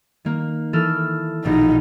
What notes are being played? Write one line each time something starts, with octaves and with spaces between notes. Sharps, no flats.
D#3 A#3
E3 A4 F6
A#1 B2 D#4